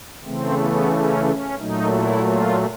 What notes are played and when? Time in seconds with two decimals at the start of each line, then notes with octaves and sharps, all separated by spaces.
0.24 C#3 E3 A3 C4
0.58 B3
0.92 C#4
1.25 C#4
1.58 A#2 F#3 A3 D#4
1.92 E4
2.25 F4